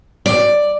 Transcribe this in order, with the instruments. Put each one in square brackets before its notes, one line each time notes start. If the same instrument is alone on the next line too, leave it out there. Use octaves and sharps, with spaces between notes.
[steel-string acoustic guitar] D5